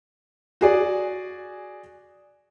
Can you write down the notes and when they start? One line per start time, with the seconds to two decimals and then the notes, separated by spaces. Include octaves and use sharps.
0.61 F#4 G#4 D5